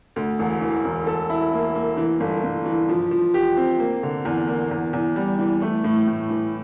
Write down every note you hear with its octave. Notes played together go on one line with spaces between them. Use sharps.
D2
E1
E3
E1
A4
E4
A#3
A#3
E3
G1
G1
E3
F3
F3
G4
C4
A#3
D3
E2
A#3
E2
E2
G3
E3
A3
A2
A2
E3